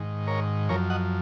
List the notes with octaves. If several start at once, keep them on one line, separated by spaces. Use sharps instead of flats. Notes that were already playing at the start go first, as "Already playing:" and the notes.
Already playing: G#2 D#3
A#4 C#5
F#2 F3 A#4 C#5
D#5 F#5